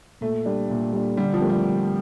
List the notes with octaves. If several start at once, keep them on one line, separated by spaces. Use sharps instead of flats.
A#2 A3
G3 D4
A#2
G3 D4
D3 G3
F3
A3 C4 G4 A#4
G3